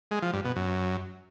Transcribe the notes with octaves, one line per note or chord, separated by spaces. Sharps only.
G#3
F3
G2
B2
F#2